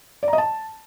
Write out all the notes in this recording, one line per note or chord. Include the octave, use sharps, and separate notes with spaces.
D5
A#5
D#5
A5